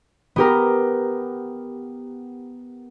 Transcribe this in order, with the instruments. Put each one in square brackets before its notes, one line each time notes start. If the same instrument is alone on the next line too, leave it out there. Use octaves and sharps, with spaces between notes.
[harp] B3 G4 A#4